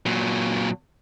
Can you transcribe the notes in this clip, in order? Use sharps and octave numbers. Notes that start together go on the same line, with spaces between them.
A#2 F#3